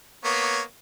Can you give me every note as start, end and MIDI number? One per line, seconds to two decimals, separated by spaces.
0.25 0.61 58
0.25 0.61 59
0.25 0.61 73